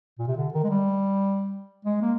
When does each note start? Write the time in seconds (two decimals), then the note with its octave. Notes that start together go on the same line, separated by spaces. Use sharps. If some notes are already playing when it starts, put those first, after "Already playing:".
0.19 A#2
0.28 C3
0.37 D3
0.54 D#3
0.64 G#3
0.70 G3
1.85 G#3
2.01 A#3